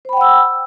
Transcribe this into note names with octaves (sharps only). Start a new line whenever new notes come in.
C5 F#5 G5 B5 E6